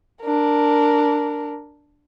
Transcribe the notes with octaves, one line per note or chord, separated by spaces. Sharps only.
D4 A#4